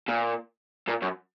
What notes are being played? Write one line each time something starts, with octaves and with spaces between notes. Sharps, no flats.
A#2
A#2
F#2